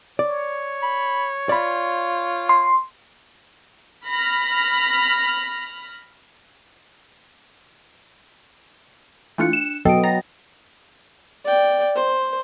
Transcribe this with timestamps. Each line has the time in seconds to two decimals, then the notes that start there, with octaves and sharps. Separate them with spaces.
0.19 C#5 D5
0.83 B5
1.49 F4 D5 B5
2.49 C6
4.05 B5 F6 A#6
9.38 E3 A3 D4 F4 F#6 C#7
9.53 E7
9.85 B2 F#3 B3 A4 D#5 G5 D7
10.04 G5 A#5 A6 A#6
11.45 D5 G5
11.96 C5